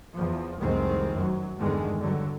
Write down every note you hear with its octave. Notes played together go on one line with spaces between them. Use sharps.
E2 F3
F1 C2 D#3 G#3 C4
F#2 F#3
E2 G2 D3 D#3 G#3
G2 D3 F#3